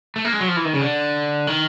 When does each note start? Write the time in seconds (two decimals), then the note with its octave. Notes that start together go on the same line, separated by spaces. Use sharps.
0.16 A3
0.25 A#3
0.33 G#3
0.41 F#3
0.48 F3
0.56 E3
0.65 D#3
0.74 C#3
0.81 D3
1.47 D#3